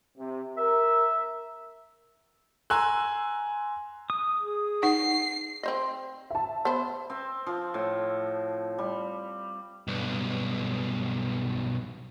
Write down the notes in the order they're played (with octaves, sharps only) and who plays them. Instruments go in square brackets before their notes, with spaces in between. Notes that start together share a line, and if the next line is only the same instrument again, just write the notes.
[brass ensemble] C3
[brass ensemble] A#4 [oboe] E5
[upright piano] G#5 A#5 C6 E6 F#6
[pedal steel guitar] D#6
[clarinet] G#4
[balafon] D#4 F#5 [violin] C7
[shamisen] C4 C5 D#5
[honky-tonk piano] E5 A5
[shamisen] B3 C5
[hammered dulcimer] C4
F3
A2
G3
[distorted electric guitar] B1 G2